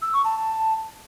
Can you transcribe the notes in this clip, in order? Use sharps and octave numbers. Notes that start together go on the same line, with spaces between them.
E6
C#6
A5